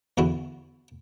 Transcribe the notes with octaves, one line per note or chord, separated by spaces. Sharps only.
E2 D3 E4 F#4